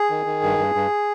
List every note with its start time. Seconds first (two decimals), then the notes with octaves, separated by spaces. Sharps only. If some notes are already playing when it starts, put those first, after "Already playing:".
Already playing: G#4
0.10 D#3
0.26 D#3
0.43 G2
0.58 G2
0.75 G2